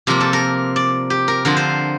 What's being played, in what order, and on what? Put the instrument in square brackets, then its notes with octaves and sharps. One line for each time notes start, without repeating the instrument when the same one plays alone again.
[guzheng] C3 F3 A#3 A#4
A4
A#4
D5
G4
A#4
D3 F3 C4 A#4
C5